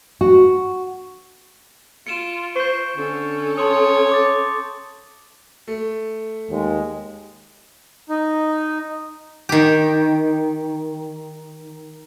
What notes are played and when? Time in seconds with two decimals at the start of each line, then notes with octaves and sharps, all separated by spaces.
0.21 F#4
2.07 F4 C#7 D7 E7
2.56 C5 C#6 G6
2.97 D3 C#4 A4
3.57 C#5 A5 C6 D#6
4.12 D6 A6
5.67 A3
6.50 D#2 G#3
8.09 D#4
9.49 D#3 G4